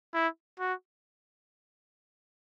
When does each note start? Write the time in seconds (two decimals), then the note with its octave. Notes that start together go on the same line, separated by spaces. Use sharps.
0.14 E4
0.59 F#4